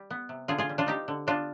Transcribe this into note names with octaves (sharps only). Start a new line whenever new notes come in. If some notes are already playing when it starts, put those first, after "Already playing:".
Already playing: G3
B3
C3
D3 F4 G#4
F4 G#4
G3
D4 F4
C4 D#4 G4
D3
B3 D4 F4